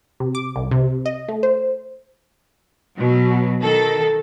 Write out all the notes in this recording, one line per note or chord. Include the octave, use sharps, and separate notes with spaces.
C3
D6
C2
C3
D#5
A3
C5
B2 F#3
D#3 A4